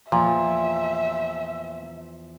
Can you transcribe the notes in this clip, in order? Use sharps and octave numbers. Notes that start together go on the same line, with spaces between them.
E2 A#2 F3 E5